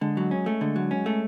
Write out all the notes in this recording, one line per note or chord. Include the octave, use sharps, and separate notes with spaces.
D3 G#3
F#3
C#4
A3
D3 G#3
F#3
C#4
A3